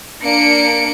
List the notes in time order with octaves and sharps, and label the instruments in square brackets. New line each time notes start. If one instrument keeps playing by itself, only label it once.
[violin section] A#3 D4 C#7 D7